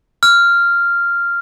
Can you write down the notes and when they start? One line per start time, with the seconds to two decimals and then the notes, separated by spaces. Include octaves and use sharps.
0.23 F6